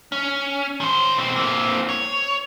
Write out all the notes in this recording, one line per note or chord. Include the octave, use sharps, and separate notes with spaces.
C#4
D#3 C5
B2 C4
A#3 C4
C#5